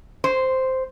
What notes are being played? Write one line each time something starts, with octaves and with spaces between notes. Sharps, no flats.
C5